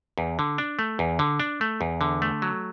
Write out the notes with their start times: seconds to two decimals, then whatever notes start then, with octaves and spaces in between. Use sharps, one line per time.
0.18 E2
0.39 D3
0.58 D4
0.79 A3
0.99 E2
1.19 D3
1.40 D4
1.61 A3
1.81 E2
2.01 D3
2.22 A3
2.42 F#3